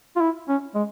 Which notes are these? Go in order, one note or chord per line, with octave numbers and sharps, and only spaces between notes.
F4
E4
C#4
G#3